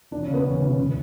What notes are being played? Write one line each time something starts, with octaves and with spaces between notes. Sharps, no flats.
E1 D4
C#4
C#3
B3
E1 C#4
C#4
D2
C#4
C#2